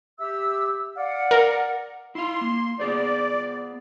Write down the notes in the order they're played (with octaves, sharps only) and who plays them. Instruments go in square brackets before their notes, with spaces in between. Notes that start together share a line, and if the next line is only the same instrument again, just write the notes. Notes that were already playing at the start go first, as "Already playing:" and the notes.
[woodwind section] G4 E5 E6
D5 F5 F#5
[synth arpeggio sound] A#4
[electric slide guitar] E4 F5 [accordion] C6
[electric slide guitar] A#3
[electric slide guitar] B3 G#4 C5 [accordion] D5